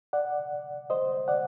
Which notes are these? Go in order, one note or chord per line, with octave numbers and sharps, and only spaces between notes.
D5 F#5
C5 D#5
D5 F#5